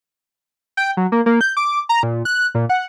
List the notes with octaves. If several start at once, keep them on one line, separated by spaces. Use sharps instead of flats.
G5
F#3
A#3
A#3
G6
D6
A#5
A#2
F#6
A#2
F#5